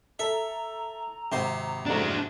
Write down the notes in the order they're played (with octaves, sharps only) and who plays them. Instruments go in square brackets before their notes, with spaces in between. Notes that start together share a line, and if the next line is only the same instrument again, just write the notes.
[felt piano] A4 [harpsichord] E5 [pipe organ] A#5
[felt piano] G#1 [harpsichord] C3 C5
[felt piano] F#1 F2 G#2 [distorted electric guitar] D4 F#4